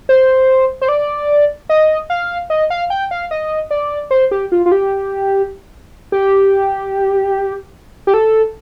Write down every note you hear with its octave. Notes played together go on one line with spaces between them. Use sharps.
C5
C5
D5
D#5
F5
D#5
F5
G5
F5
D#5
D5
C5
G4
F4
F4
G4
G4
G4
A4